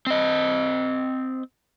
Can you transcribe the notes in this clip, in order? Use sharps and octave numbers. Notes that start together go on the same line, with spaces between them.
C4 D#5